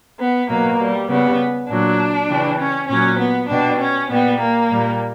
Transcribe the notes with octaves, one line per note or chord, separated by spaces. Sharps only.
B3
B2 F#3 A#3
G3
C#3 G3 B3
A#2 F#3 D4
C#3 E3 G3
C#4
A#2 F#3 C#4
B3
B2 G3 D4
C#4
A#2 G3 B3
A#3
A#2 G3